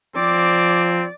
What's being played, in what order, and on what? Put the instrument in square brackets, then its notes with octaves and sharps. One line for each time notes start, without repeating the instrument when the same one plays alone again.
[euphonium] F3 [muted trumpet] C4 [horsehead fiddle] D5 [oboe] D6